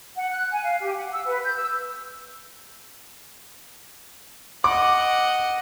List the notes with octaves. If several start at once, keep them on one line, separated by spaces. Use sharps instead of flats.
F#5
F#6
G#5
F5
G4
F#5
E6
B4
G6
E6
D#5 F#5 D6